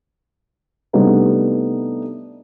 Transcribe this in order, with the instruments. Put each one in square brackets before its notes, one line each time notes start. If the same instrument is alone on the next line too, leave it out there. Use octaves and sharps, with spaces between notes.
[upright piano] C3 G3 A3 B3 D4 D#4